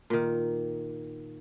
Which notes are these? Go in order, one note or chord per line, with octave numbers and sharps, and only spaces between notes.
A#2 D#3